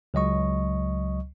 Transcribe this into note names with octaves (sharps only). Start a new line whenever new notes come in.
C#2 F#3 D#5 C#6